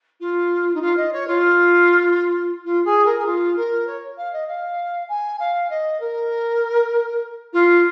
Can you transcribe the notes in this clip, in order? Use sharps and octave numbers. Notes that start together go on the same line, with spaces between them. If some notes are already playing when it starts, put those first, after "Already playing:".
F4
D#4
F4
D#5
C#5
F4
F4
G#4
A#4
G#4
F4
A#4
C#5
F5
D#5
F5
G#5
F5
D#5
A#4
F4